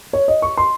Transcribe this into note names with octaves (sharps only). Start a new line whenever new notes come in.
C#5
D#5
C#6
C6